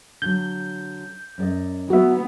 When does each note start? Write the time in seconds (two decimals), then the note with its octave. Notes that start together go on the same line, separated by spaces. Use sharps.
0.22 D3 F#3 G6
1.38 F#2 D5 D#5
1.90 F#3 B3 F#4 E5